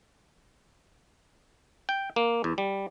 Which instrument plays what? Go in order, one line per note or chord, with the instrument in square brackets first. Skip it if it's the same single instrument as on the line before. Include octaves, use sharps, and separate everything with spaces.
[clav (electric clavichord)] G5
A#3
E2
G3